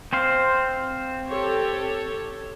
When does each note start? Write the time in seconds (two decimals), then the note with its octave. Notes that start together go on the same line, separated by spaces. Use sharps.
0.13 C4 C5 F5
1.28 G4 A4 C#5